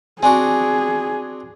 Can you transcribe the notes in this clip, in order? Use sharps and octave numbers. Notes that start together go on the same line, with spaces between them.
C4 D4 F#4 G#4 G#5